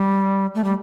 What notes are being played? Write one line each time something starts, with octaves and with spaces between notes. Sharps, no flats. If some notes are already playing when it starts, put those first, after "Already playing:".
Already playing: G3
A3
G3